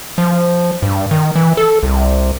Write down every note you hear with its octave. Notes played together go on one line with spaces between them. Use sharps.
F3
G2
D#3
E3
A4
C2